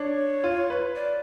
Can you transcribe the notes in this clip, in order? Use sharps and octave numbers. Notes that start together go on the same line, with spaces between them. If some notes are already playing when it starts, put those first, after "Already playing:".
Already playing: D4 C#5
F4
B4
D5